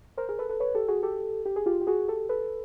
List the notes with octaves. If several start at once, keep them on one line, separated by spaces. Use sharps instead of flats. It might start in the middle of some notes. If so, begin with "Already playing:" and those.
A#4 C5
G#4 A#4
A4 B4
A4 B4
B4 C#5
G4 A4
F#4 G#4
G4 A4
G4
G#4
F4 G4
G4
F#4 G#4
G4 A4
A4 B4